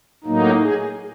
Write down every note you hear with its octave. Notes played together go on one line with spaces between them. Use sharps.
A2 F#3 A#3 D#4
G#4